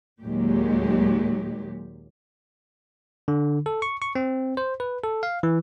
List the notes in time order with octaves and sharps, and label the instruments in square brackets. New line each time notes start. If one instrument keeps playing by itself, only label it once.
[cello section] D#2 A#2 F#3 G#3 G4
[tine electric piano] D3
A4
C#6
C#6
C4
C5
B4
A4
F5
E3